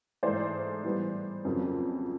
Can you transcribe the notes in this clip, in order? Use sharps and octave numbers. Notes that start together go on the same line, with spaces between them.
G#2 E3 A3 C5 D5
A2 E3 G3 B3
F2 C#3 F#3 A#3